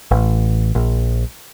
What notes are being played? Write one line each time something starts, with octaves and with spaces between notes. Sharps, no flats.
A1
A#1